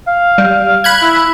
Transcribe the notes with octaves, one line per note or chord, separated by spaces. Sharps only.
F5
G3
B5 F#6 G#6
E4